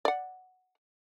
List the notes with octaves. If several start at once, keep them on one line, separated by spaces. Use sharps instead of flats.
D5 F#5